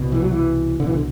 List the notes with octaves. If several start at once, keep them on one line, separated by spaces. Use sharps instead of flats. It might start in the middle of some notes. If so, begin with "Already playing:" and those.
Already playing: C2 B2
E3
F#3
E3
C2 B2 D3 E3
D3